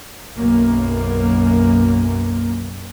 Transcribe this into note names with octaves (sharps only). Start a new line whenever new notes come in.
B1 F#2 A#3